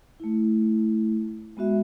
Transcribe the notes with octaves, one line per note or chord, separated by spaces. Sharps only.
A3 E4
G#3 B3 F#4 E5